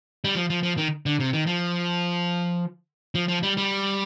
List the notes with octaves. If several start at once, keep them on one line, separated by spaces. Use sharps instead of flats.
G3
F3
F3
F3
D#3
D3
C3
D#3
F3
F3
F3
G3
G3